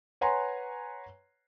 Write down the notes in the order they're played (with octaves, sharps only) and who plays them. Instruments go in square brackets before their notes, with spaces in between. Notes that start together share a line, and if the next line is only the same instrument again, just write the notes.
[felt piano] B4 C#5 F#5 G#5 A#5 C6